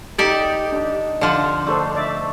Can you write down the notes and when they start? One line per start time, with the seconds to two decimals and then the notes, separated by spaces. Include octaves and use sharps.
0.18 D#4 G4 A4 D5
0.73 D4
1.21 D3 F3 C5 D5
1.67 A3 D4 A4 C5
1.95 D5 E5